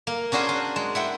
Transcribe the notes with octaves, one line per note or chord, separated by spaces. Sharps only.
A#3
C#4 D4 F#4 G#4 C5
D4
G#3
E4 F#5 G5